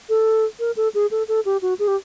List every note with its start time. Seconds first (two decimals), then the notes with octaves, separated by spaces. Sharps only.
0.09 A4
0.59 A#4
0.76 A4
0.94 G#4
1.11 A4
1.28 A4
1.45 G4
1.62 F#4
1.79 G#4
1.88 G4